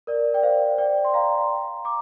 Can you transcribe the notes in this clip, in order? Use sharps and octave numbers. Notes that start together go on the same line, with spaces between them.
A#4 D5
D5 G5
C5 F5
D5 G5
C6
F5 A#5
A#5 D6